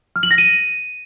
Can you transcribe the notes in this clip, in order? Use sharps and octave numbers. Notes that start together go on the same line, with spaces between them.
F6
F#7
A#6
D#7